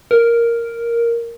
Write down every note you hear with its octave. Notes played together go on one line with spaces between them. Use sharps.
A#4